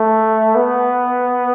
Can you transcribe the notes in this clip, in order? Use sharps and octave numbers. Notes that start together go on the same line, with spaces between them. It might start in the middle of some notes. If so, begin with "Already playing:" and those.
Already playing: A3
B3